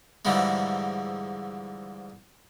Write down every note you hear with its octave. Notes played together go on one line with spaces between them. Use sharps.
G#2 D3 E3 F3 G3 G#3